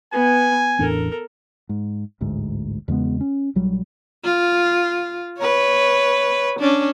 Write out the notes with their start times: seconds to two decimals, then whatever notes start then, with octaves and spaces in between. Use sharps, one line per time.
0.12 B3 B4 G#5
0.79 A1 E2 D4 A4 A#4
1.69 G#2
2.21 A1 D2 G#2
2.88 E2 C#3 G#3 B3
3.21 C#4
3.55 A#1 F#3 G3
4.25 F4
5.39 B4 C#5
6.60 C#4 D4